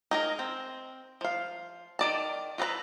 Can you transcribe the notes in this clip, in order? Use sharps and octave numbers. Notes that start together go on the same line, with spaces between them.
D#4 G#4 A#4
C4
F3 F5
D#3 D5 A5
F4 F#4 A4 B4 A#5